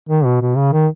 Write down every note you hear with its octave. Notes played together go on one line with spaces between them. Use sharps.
D#3
B2
B2
C#3
D#3